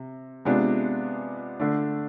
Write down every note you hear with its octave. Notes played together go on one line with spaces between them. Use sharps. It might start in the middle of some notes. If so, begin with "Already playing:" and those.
Already playing: C3
C3 G#3 B3 D4 F4
D3 A3 D4